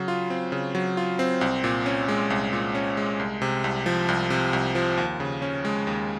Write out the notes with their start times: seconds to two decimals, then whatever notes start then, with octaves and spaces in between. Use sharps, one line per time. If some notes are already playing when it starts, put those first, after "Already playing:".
Already playing: C#3 F#3
0.08 F4
0.30 C4
0.52 C#3
0.75 F#3
0.97 F4
1.19 C4
1.41 C2
1.64 A#2
1.86 C#4
2.08 G#3
2.30 C2
2.53 A#2
2.75 C#4
2.97 G#3
3.20 C2
3.42 C3
3.64 C2
3.86 F3
4.09 C2
4.30 C3
4.53 C2
4.75 F3
4.98 D#2
5.20 C#3
5.42 C#4
5.65 G#3
5.87 D#2